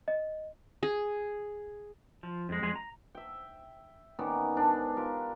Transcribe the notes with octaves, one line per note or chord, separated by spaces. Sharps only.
D#5
G#4
F3
F2 G#3
F2 G#3 G#4
A#5
E5 G5
D#3 B3 C#4 D5
G#2 D4
F4 G4 A#4